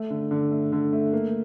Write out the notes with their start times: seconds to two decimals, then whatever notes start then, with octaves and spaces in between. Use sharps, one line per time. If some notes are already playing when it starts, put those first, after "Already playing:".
Already playing: A3
0.10 D3
0.31 D3
0.51 A3
0.72 D3
0.93 A3
1.13 A#3